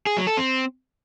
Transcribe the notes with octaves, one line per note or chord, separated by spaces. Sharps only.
G#4
F#3
A4
C4